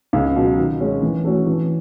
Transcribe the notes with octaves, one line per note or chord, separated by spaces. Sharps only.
C#2
B2 F#3
D#3
G#3 C#4
E3
A3 C#4 F#4
E3